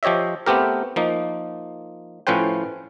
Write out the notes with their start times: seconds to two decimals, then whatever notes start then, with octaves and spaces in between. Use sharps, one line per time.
0.03 F3 G4 C#5 D#5 E5
0.46 A3 B3 C4 G4 A#4
0.96 F3 A#3 D#4
2.27 A2 F3 C#4 B4 C5 G5